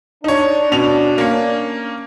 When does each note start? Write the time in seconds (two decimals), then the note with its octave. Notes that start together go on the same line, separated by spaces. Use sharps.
0.24 D4 D#4 C#5
0.72 B2 C#4 F7
1.18 A#3 C#4